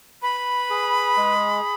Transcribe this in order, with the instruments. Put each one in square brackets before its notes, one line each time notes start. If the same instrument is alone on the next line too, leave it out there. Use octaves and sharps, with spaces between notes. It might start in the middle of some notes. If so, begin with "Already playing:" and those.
[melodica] B4 [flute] B5
[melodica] G#4
G#3